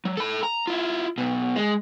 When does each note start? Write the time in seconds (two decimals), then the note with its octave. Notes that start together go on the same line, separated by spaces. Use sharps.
0.05 F#3
0.17 A4 B5
0.43 A#5
0.67 E4 F4
1.18 B1 B2
1.56 G#3